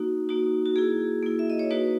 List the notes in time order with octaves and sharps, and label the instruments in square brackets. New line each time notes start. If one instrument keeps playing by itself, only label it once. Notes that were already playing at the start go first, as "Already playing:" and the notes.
Already playing: [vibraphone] A#3 D#4 F#4
A#3 D#4 F#4
F#4
A#3 E4 G#4
A#3 E4
E5
D#5
C#5
A#3 D#4 F#4 B4